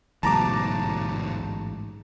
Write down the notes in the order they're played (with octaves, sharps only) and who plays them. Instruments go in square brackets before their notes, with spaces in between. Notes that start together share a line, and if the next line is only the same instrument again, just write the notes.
[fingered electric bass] A1 G#2 F#3 [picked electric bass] D2 B2 [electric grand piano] A5 A#5 D6